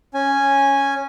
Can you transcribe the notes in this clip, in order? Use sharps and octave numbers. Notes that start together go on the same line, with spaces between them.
C#4 G#5